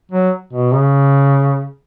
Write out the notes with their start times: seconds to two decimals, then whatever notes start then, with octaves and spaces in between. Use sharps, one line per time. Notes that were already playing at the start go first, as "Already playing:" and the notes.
0.12 F#3
0.53 B2
0.74 C#3